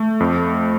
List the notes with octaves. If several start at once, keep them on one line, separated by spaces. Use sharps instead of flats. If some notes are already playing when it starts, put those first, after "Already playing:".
Already playing: A3
F2